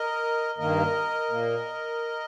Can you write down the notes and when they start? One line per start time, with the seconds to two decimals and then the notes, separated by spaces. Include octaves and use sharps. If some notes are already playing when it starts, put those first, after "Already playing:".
Already playing: A#4 D#5
0.58 G2 D#3 A#3 A#4 D#5
1.30 A#2 A#3